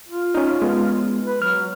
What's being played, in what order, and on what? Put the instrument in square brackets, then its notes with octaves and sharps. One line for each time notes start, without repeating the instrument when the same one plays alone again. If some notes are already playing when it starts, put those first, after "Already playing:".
[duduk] F4
[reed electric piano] C#4 D#4
G#3 B3
[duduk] B4
[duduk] F#3 [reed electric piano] F6